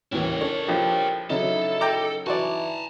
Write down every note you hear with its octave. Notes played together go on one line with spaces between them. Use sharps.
D#2 A2 E3 C#4 E4 A#4
D4 A4 C#5
A#1 F3 G4
C#3 F#3 D#4 E4 A4
G5 A#5 D6
E3 F#4 D5 G#5 A5